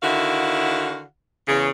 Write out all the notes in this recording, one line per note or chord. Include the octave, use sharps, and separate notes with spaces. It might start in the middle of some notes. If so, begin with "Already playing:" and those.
D3 D#3 E4 F#4 F5 F#5
E2 C#3 G#4